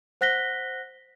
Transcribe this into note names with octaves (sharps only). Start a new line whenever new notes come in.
C5 F#5 F#6 A#6 B6 G7